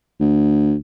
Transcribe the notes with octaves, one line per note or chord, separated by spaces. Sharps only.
D2